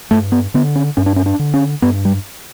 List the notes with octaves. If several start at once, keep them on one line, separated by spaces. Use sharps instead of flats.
G2 A3
B3
D3 B3
C#4
G2 C#4
D4
C#4
D4
D3
C#4
G2 B3
G3